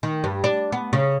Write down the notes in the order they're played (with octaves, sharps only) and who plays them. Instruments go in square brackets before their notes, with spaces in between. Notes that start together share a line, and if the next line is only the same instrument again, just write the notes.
[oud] D#3
G2
D4
B3
C#3